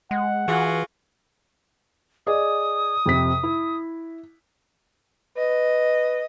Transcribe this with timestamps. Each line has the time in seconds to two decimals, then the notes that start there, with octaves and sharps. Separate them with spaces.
0.11 G#3 F#5
0.48 E3 F4 F#4 G#4
2.27 G#4 D5 D#5 D#6
3.06 F2 C3 B6
3.43 E4
5.37 B4 D#5